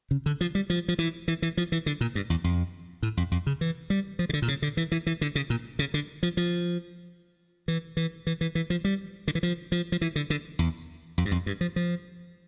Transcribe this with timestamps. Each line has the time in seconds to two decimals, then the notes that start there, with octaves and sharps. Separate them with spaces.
0.11 C#3
0.26 D3
0.41 F3
0.55 G3
0.70 F3
0.88 F3
0.99 E3
1.28 E3
1.42 E3
1.57 F3
1.72 E3
1.86 D3
2.01 A#2
2.15 G2
2.30 E2
2.44 F2
3.03 A2
3.17 F2
3.31 F2
3.47 C#3
3.61 E3
3.90 G3
4.19 F3
4.29 C#3
4.33 D3
4.42 A#2
4.48 C#3
4.62 D3
4.77 E3
4.92 E3
5.07 E3
5.21 D3
5.35 C#3
5.50 A#2
5.79 C#3
5.94 D3
6.23 F3
6.37 F3
7.68 E3
7.97 E3
8.27 E3
8.41 E3
8.55 E3
8.70 F3
8.85 G3
9.28 D3
9.35 E3
9.43 F3
9.72 F3
9.92 F3
10.01 E3
10.16 D3
10.30 D3
10.59 E2
11.18 F2
11.25 G2
11.32 F2
11.46 G2
11.61 F3
11.76 F3